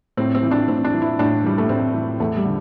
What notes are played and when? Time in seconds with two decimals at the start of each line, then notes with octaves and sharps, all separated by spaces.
0.17 A2 C4
0.35 C4
0.43 E3
0.51 D4
0.68 A2 C4
0.84 D4
0.93 E3
1.02 E4
1.19 A2 D4
1.44 E3 G3
1.58 A3
1.69 A2 C4
1.94 E3
2.20 E2 A3
2.37 G3
2.45 D3